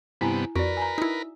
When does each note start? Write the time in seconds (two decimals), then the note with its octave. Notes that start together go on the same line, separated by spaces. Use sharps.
0.21 G2 C3 B3 E4 G#5 A#5
0.56 F2 F#4 A#4 B4 D5
0.77 G#5 A#5
0.98 D#4 E4